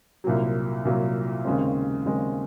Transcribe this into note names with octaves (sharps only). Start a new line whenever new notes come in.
C2 A#2 F#3
C2 A#2 F#3
D#2 C#3 G#3 C4
D#2 C#3 G#3 C4